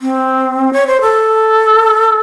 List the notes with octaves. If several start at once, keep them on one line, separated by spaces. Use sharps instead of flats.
C4
C#5
C5
A4